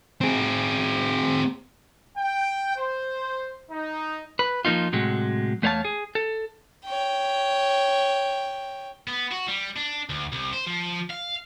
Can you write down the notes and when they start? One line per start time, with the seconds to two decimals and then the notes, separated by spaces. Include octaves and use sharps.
0.21 C4 G#4
2.18 G5
2.76 C5
3.71 D#4
4.39 B4
4.65 F3 A#3 D#4 F4
4.92 A2 C3 F#3 G#3
5.62 E2 A3 C5 C#5 F5 A5
5.85 G#4
6.15 A4
6.85 C#5 G5
9.08 B3
9.32 F#4
9.48 G3
9.77 D4
10.10 D2
10.32 C2
10.53 C5
10.67 F3
11.11 F5